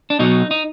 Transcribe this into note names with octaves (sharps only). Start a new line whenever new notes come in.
D4
B2 F#3 D#4
D#4